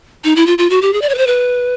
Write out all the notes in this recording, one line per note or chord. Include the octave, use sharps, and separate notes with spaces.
D#4
E4
F4
F4
F#4
G4
G#4
D5
C#5
B4
C5
B4